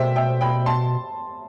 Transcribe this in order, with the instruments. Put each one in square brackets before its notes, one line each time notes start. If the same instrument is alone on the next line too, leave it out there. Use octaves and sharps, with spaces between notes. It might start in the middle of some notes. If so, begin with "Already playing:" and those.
Already playing: [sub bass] B2 [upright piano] C5 E5 G5
[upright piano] E5 G5
G5 B5
A5 C6